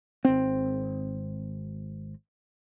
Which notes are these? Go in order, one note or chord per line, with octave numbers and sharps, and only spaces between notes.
G#1 C4